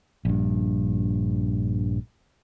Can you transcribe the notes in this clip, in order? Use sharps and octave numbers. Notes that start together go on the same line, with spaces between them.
A#1 G2